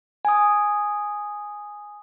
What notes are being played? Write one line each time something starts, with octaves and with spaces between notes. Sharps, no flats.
G#5 D#6